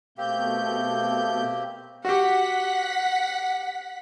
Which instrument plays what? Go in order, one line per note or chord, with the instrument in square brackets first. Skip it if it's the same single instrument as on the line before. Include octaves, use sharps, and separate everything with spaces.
[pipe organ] B2 A3 G6 [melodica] A#3 C4 G4
[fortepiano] F#4 G4 [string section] F#5 B6